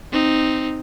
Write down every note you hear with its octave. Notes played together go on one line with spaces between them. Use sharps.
C4 D#4